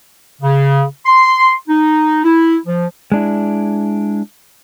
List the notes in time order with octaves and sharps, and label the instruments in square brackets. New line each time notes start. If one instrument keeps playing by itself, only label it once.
[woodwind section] C#3
C6
D#4
E4
F3
[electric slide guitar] G#3 D4 E4